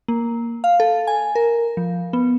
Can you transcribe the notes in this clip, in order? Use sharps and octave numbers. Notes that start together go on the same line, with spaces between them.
A#3
F5
A4
G#5
A#4
F3
B3